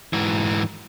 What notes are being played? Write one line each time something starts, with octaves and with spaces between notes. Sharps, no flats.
G#2 E3